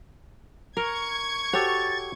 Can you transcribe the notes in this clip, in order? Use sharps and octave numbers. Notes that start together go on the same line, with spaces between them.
A#4 C#6 G#6
F#4 G4 A4 C#5 A6